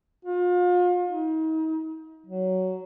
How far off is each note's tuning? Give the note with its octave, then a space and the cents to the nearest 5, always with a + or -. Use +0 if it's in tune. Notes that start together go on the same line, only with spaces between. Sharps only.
F4 +35
D#4 +35
F#3 +10